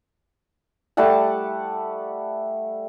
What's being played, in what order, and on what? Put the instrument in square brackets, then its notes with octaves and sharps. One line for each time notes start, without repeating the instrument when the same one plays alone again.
[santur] G3 A3 F#5 A5